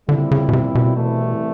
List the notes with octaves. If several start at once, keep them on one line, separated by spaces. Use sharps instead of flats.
A#2 D3 G3 C4 E4
C#3
B2
C3
B2
C2 C3 E3 A3